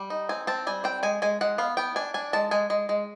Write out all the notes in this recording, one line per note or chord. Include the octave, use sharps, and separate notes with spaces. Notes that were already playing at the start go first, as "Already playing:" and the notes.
Already playing: G3
D#4
C4 G#5
C4 A5
G3 G#5
C4 G5
G#3 G#5
G#3 G#5
G#3 F#5
B3 F5
B3 G5
D4 G#5
D4 G#5
G#3 A5
G#3 G#5
G#3
G#3